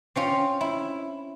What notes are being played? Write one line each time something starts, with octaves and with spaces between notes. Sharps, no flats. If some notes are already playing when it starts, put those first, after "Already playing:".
C4 C#4 F4
E4